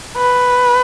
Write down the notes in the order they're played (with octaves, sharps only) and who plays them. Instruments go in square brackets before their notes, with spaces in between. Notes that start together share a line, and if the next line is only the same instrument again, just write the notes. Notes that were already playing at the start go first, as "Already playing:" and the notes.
[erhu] B4